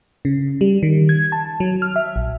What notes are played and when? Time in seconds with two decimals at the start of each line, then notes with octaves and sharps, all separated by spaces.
0.25 C#3
0.61 G3
0.83 D#3
1.09 G#6
1.32 A5
1.60 F#3
1.82 F6
1.96 E5
2.16 A#1